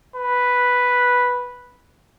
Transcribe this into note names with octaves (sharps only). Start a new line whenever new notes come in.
B4